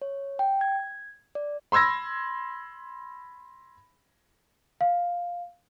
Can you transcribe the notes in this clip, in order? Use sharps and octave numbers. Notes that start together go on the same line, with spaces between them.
C#5
G5
G#6
D5
B5 C6 E6 G#6 A#6
F5